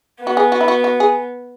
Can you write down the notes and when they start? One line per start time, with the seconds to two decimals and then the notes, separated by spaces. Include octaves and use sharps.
0.21 B3
0.27 F#4
0.37 G#4
0.52 F#4
0.61 E4
0.68 F#4
0.84 F#4
1.00 G#4